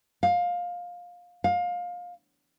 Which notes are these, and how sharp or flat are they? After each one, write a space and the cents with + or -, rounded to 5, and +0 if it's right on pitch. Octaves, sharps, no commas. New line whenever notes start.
F5 +20
F5 +25